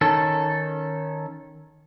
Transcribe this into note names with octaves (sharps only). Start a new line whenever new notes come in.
D#3 C#4 A4